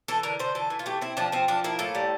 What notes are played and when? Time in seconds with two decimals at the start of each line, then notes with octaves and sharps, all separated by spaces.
0.08 E3 A4
0.23 D3 A#4
0.39 D3 C5
0.55 E3 A4
0.70 E3
0.79 F4
0.86 A3 G4
1.01 C4 E4
1.17 F3 D4
1.32 F3 C4
1.48 F3 D4
1.64 A#3 E4
1.79 A2 A4
1.95 G3